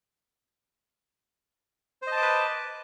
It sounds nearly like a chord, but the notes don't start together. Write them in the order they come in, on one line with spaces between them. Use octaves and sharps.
C5 D#5 A5 D6 B4